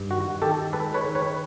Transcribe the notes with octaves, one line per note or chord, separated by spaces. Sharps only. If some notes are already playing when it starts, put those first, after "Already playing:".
Already playing: G2
D#3 F#4
D#3 G4 A4
G#3 A4 B4
B4 C#5
D#3
B4 C#5